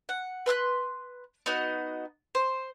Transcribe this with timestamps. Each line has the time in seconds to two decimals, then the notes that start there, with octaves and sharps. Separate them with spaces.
0.09 F#5
0.46 B4 C6 F6 F#6
1.46 B3 D#4 F#4 D#5
2.35 C5